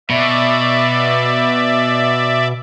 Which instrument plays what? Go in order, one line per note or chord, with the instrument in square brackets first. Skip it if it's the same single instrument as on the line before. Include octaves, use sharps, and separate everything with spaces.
[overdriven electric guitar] B2 [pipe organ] D5 E5